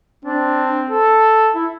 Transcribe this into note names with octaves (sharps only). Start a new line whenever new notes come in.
C4 D4
A4
E4